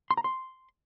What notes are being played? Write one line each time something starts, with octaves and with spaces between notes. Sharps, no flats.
C6
A#5
C6